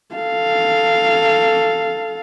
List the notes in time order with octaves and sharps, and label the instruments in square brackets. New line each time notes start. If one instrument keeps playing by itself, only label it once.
[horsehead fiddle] A4 F5